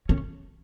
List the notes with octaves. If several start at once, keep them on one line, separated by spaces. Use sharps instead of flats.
C#4